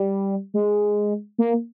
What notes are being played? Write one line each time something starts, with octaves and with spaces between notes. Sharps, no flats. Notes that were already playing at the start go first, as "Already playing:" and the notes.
Already playing: G3
G#3
A#3